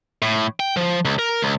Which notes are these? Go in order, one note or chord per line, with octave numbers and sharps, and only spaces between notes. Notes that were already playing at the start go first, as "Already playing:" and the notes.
A2
G5
F3
C#2
A#4
C#2